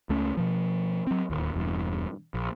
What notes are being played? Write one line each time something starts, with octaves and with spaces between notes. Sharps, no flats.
C#2 A3 C#4
B2 F3
F#3 C4
D1 D#2
E1 E2 G2
A#1